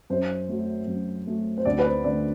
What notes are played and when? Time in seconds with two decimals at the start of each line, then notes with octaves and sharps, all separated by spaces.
0.10 F#2 C5
0.49 F#3 A3
0.87 F#2
1.27 F#3 A3
1.58 C5
1.65 D2 D5
1.79 B4
1.85 C5
2.04 D3 A3 D5